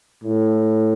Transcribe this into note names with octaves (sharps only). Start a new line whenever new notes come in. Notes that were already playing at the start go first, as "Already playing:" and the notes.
A2